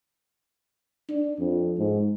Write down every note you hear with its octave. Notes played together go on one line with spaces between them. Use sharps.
D4
F2
G#2